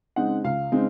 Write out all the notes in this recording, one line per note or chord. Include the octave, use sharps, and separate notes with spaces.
C#3 G#3 C4 D#4 F#5
C#2 F5
C#3 G#3 C4 D#4